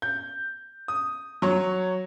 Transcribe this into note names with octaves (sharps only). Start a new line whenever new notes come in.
G6
D#6
F#3 C#5